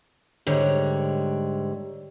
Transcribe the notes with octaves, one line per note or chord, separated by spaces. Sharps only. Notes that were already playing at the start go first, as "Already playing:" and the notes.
G#2 D3 G3 C#5